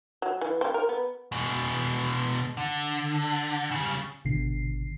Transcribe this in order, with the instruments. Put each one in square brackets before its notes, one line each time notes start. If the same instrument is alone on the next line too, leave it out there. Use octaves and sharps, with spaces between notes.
[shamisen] F#3
E3
C4
A#4
B3
[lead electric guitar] B2 G#3
D3
C#3 G3
[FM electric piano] G#1 B2 D3 C7